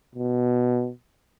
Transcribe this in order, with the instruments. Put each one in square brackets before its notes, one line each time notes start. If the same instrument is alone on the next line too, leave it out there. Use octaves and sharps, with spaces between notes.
[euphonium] B2